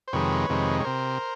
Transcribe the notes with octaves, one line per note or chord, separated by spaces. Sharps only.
C5
F2 C3 D#3 G#3 B4 C#5
F2 C3 D#3 G#3
C#5
C3 A#4 C5